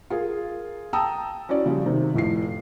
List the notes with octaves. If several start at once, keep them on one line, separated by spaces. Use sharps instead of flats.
F4 G#4 A#4
G5 A5 A#5 D#6 E6
C#4 E4 F#4 D5
C#3 F3 G3
C3 D#3
F1 A2 F4 C7